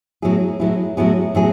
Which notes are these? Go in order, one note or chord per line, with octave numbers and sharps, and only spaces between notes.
A2 F#3 B3 E4 G#4
A2 F#3 B3 E4 G#4
A2 F#3 B3 E4 G#4
A2 F#3 B3 E4 G#4